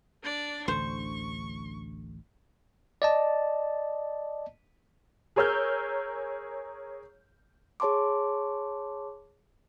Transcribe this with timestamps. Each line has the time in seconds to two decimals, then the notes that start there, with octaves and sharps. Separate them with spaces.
0.23 D4 D5
0.68 A1 D2 D3 C5 C#6
3.02 D5 D#5 A5
5.36 G#4 A#4 C#5 E6 F6 G6
7.80 G#4 C#5 A5 C6 D6